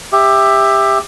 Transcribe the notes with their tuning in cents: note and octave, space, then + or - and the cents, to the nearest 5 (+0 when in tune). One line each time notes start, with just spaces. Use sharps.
G4 +20 E5 +0